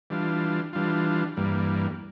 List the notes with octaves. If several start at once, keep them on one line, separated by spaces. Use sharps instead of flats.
E3 G3 D4 F4
E3 G3 D4 F4
G2 E3 G3 A#3